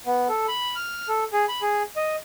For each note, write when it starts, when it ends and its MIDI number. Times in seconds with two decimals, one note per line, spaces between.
0.06 0.28 59
0.29 0.46 69
0.48 0.76 83
0.76 1.08 89
1.08 1.24 69
1.33 1.45 68
1.49 1.61 83
1.62 1.83 68
1.96 2.16 75